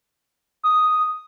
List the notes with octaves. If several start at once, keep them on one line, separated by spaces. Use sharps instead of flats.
D#6